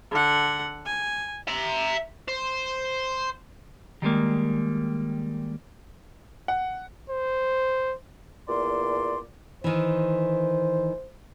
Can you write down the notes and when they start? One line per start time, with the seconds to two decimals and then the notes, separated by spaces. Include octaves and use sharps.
0.11 D3 F#5
0.86 G#5
1.48 E5 A#5
2.28 C5
4.02 D#3 G3 G#3 A#3
6.48 F#5
7.10 C5
8.49 E2 A#2 D5 C6
9.64 D#3 E3 C5